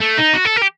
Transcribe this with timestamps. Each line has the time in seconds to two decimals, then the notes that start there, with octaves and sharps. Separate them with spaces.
0.01 A3
0.19 D#4
0.34 F#4
0.46 A4
0.57 A#4
0.62 G4